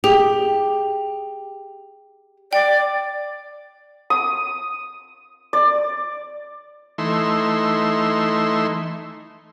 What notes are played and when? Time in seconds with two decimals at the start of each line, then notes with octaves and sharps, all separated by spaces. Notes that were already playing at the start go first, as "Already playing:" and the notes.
0.04 G4 G#4
2.53 D5 G5
4.10 D#6
5.53 D5
6.98 E3 A3 D#4 C6 E6